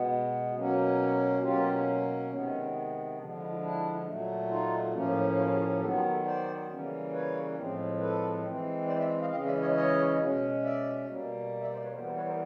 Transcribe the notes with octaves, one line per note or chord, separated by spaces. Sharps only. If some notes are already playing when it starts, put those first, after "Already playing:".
Already playing: B2 G#3 B3
B2 F#3 A#3 C#4
B2 F#3 A#3 C#4 F4 G4
C3 D#3 G#3 B3 C#4
D3 F3 G#3 D4
D4 E4
D4 E4
A#2 F#3 A3
D#4 F4
A2 F3 A#3 C#4
E4 F#4
F#4 G#4
G4 A4
D#3 F#3 B3 G4 A4
F4 G4
G4 A4
C5 D5
C#3 E3 G3 A#3 C#4
B4 C#5
A2 F3 G#3 C4
A4 B4
E3 G#3 C4
C5 D5
D5 E5
D#5 F5
C#3 E3 G#3 C#4 D#5 F5
D5 E5
C#5 D#5
C#5 D#5
B2 G#3 C#4
D5 E5
B2 G3 A#3
D5 E5
C5 D5
B4 C#5
E3 G3 B3 A#4 C5
A#4 C5
B4 C#5
A#4 C5